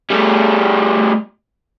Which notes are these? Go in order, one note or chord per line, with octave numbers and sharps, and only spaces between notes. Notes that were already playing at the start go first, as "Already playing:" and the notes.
G3 A3